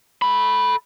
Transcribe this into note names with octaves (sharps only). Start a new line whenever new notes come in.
A4 B5